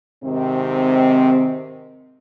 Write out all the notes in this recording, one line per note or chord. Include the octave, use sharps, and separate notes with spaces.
G#2 C3 D#3 C4